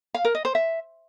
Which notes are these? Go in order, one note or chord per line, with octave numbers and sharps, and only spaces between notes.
F5
A#4
D#5
C5
E5